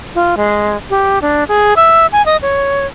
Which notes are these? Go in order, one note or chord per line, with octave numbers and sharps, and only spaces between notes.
F4
G#3
G4
D4
G#4
E5
G#5
D#5
C#5